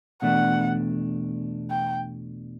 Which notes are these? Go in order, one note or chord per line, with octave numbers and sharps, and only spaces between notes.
E2 B2 A3 D4 F#5
G5